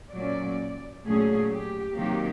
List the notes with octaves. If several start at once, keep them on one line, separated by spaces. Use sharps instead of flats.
A#2 F#3 A#3 C#4 D5
A#2 F#3 A3 C#4 G#4
G4
C3 D#3 F#3 A#3 G4